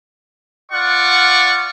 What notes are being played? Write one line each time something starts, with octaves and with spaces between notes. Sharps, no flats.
F4 D5 F#5 C#6